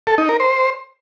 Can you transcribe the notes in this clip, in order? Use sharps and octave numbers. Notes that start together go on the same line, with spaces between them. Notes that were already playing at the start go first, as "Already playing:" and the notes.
A4
D#4
A#4
C5